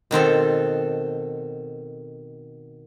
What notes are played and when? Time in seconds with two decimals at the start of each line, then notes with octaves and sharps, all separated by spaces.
0.11 B2 D#3 C4 A4